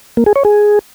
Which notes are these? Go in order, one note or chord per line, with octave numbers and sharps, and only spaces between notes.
A#3
G#4
C#5
G#4